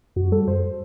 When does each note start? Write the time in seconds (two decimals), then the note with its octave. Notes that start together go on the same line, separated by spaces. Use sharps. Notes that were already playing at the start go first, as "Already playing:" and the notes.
0.16 F#2 F#4
0.32 G3 A4
0.47 F#2 C5